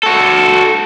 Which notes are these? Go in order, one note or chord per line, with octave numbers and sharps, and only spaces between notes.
F#4 A4